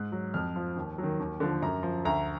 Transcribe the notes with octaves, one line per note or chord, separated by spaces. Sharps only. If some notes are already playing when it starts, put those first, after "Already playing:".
Already playing: G#2 F#6
F#3
F2 F6
F3
D#2
D#3 F#3
D#2
D3 F3
F#2 A#5
F3
D2 A#5